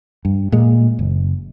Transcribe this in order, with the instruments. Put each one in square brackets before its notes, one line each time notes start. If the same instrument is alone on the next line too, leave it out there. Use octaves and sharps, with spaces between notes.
[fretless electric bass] G2
A#2 G#3
F#1